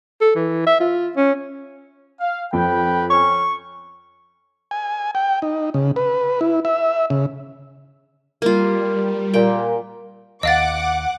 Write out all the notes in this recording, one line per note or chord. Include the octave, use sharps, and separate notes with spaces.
A4
E3
E5
F4
C#4
F5
F2 B4 G5
C#4 C#6
G#5
G5
D#4
C#3
B4
E4
E5
C#3
G3 A#3 F4
A#2 G5
D#2 D#5 F5 F#5 D6 A6